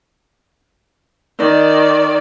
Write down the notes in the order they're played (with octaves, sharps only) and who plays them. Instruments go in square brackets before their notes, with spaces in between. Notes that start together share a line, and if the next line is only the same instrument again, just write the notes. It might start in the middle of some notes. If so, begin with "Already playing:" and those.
[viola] D#3 D5